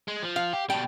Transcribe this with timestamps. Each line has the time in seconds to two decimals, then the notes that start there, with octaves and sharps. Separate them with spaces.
0.08 G#3
0.23 F3
0.36 F5
0.53 G4
0.70 B2 G3 G5